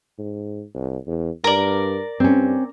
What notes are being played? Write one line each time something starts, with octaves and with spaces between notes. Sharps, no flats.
G#2
C2
E2
G2 A#4 D5
G2 C4 C#4